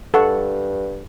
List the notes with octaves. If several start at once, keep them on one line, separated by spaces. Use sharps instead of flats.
G2 A4 F#5 C#6